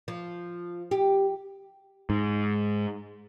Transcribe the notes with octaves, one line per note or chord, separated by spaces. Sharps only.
F3
G4
G#2